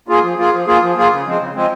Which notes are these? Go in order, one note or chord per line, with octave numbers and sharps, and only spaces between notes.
A#3 F4 G#4
F3
A#3 F4 G#4
F3
A#3 F4 G#4
F3
A#3 F4 G#4
C#3
F3 G#3 C4
C#3
F3 G#3 C4